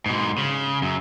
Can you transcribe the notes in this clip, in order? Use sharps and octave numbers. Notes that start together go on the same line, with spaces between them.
G#2 B2
C#3
F#2